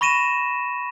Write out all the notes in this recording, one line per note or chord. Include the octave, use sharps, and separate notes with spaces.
B5 C#6 A#6 D#7 E7